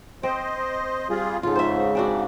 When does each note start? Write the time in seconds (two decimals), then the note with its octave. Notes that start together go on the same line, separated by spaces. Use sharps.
0.23 C4 C5 D#5
1.10 G3 F4 G#4
1.43 G#2 C#3 F4 A4
1.55 C5 E5
1.95 C4 D4 F#4